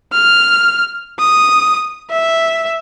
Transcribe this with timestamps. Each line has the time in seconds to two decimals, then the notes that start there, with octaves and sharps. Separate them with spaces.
0.13 F6
1.19 D#6
2.11 E5